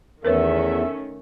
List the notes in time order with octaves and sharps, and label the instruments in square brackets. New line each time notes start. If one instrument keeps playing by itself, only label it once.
[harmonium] E2 [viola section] D#3 A3 C#4 [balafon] A#4 B4 C#5 [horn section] E5